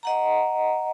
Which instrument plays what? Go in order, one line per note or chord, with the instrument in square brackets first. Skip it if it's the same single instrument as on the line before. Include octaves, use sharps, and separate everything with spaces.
[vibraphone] D#5 F#5 A#5